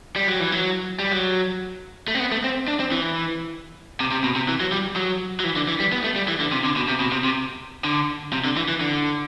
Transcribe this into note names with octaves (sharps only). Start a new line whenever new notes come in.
G3
F#3
E3
F#3
G3
F#3
A3
C4
B3
A3
C4
D4
C4
E3
C3
C3
B2
C3
E3
F#3
G3
F#3
F#3
E3
D3
E3
G3
B3
A3
G3
E3
D3
C3
D3
B2
C3
B2
C3
C3
D3
C3
D3
E3
E3
D3